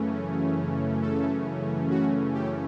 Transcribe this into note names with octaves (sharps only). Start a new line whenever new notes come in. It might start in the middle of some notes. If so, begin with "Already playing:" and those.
Already playing: F#2 C#3 E3 A3 C#4
A4
F#4
G4